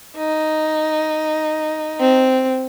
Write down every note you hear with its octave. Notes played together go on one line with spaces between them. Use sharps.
D#4
C4